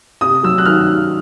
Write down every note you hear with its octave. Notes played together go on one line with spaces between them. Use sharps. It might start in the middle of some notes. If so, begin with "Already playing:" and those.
C3 D#6
F#3 E6
F#6
D#3 F6